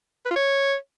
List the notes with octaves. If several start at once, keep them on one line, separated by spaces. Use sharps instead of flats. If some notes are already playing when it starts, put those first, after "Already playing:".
B4
F4
C#5